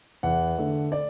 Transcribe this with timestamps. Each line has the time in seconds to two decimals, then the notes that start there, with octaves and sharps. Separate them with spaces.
0.23 E2 F#5
0.58 D3 A3
0.92 D5